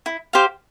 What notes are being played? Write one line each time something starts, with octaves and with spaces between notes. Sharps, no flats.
E4
G4 C5 F5